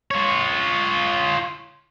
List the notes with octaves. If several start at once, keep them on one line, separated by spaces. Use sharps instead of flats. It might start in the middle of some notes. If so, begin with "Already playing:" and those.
F4 C#5